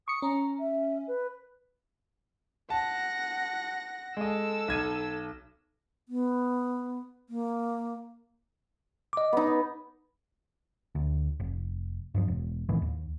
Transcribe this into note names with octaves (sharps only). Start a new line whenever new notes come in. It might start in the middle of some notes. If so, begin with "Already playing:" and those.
C#6 D#6 C#7
C#4 A#5
E5
B4
F#5 A5 A#6
G#3 A4 D#5 E6
B1 G#6 D#7
B3
A#3
D#5 D6
B3 D#4
D2
F1
G2 D#3 F3
E1
B1 A2 D#3 E3
D#2